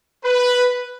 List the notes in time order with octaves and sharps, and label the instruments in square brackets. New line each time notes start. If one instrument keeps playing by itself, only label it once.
[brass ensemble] B4